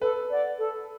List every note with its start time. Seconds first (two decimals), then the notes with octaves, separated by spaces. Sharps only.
0.01 A4 B4
0.30 D5 F#5
0.58 A4